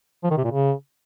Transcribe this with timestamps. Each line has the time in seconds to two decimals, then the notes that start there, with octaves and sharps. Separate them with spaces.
0.24 F3
0.31 D#3
0.38 C3
0.44 A#2
0.51 C#3